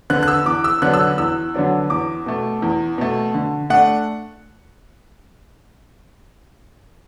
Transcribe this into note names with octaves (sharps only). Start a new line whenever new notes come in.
D3 B3 F#6
F#6
E6
E2 D6
E6
D3 F#3 B3 D4 F#6
E6
F#6
E2 E6
D3 F#3 B3 D4
E2 D6
B2 A3
E2
B2 A3
D3
A3 D4 F#5